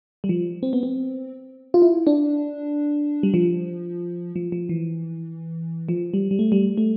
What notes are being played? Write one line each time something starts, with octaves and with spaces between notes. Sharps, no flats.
G3
F3
C4
B3
C4
F4
E4
D4
G3
F3
F3
F3
E3
F3
G3
G3
A3
G3
A3